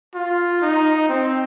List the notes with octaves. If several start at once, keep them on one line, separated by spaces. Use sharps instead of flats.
F4
D#4
C4